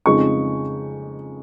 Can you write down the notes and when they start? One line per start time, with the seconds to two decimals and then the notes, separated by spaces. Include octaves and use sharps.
0.06 F2 C#3 G#3 D#4 C#6